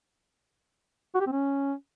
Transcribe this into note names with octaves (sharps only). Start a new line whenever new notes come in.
F#4
G4
C4
C#4